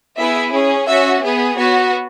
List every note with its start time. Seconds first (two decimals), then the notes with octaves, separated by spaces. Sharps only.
0.18 B3 E4 G#4 E5
0.53 C#4 G#4
0.88 C#4 F#4 E5
1.23 B3 G#4
1.58 B3 F#4 C#5